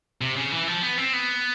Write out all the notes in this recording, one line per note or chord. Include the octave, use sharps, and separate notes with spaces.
C3
C#3
E3
F3
B3
C4
B3